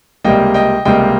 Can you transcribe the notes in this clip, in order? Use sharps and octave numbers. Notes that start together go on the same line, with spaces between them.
C#2 C3 G3 A#3 D#5 G5
D#5 G5
C#2 C3 G3 A#3 D#5 G5